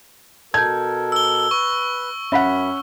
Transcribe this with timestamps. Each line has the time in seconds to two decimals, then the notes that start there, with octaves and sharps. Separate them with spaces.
0.54 B2 A4 A#4 A5 G6 G#6
1.12 E6 G7
1.51 B4 C#6
2.32 F#2 C#4 E5 F#5 B5 B6